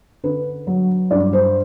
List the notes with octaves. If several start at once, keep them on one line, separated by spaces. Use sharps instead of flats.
D3 B4
F#3
G2 D5
C5